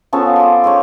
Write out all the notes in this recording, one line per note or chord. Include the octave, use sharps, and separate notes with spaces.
F3 B3 C#4 A4
C6 D6
C#5 F5 G5 C6